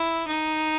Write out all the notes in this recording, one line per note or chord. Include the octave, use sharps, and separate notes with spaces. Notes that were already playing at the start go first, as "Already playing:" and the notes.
Already playing: E4
D#4